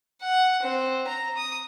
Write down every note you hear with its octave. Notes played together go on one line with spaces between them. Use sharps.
F#5
C4
A#5
D#6